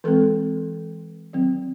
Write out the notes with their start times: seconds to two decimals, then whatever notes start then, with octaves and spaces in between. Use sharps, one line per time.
0.04 E3 G#3 C4 A4
1.33 D#3 F#3 C4